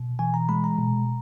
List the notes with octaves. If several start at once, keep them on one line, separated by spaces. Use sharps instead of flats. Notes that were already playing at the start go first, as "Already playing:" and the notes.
Already playing: B2
E3 G#5
A#5
G#3 B5
A#5
B2